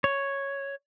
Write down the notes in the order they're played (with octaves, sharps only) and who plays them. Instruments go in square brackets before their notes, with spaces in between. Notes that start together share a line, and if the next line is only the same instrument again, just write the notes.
[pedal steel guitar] C#5